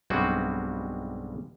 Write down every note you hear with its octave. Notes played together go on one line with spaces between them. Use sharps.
B1 G2 G3 G#3 C4 F#4